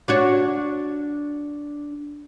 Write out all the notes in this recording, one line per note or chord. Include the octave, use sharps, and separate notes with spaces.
D4 F#4 C#5